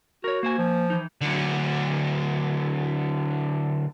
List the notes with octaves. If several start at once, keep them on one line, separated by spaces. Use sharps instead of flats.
F#4 A#4 C#5
A#3 C5 G#5
F3
E3 D#4
D3 F#3